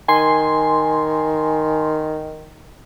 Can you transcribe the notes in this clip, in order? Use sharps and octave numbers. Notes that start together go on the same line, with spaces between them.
D#3 G#5 C6